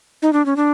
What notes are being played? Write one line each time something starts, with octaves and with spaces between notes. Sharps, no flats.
D#4
D4
C#4
D4